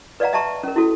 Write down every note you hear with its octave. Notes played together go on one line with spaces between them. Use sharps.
B4 D5 D#5 F5 F#5 A#5
D#5 E5 G5 A5 A#5 C#6
C#4 A#4
E4 F#4 A4